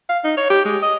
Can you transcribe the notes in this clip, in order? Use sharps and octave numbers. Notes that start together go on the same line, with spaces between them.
F5
D#4
C#5
G4
G#3
D#5